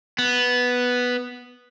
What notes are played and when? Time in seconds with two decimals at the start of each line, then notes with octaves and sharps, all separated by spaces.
0.19 B3